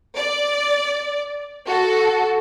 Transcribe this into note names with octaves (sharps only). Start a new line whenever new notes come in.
D5
F#4 A4